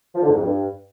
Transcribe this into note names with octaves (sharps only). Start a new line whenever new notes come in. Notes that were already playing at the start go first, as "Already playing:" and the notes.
F3
D3
G#2
F2
G2